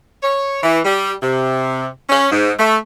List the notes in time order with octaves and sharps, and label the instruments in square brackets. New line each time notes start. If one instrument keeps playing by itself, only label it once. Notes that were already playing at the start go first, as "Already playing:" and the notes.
[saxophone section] C#5
E3
G3
C3
C#4
G#2
A3